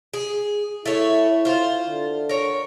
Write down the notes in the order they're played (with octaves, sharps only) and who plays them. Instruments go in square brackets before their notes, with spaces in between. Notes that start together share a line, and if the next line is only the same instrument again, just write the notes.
[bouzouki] G#4
[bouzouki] A3 C#5 [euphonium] E4
[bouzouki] F4 C5
[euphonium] D3
[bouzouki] A#4 C#5